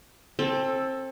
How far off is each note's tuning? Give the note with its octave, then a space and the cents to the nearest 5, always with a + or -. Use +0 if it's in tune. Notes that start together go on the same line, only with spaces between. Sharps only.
C4 +25 A4 +0